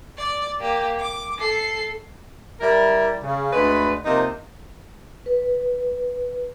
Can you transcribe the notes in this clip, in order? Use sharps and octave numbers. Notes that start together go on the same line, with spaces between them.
D5
A#3 G4
D6
A4 C7
G3 E4 A#4
C#3
D2 G#3 B4
C3 F3 A#3 D#4
B4